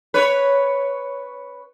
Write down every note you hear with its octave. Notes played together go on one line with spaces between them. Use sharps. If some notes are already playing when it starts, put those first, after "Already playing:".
B4 C#5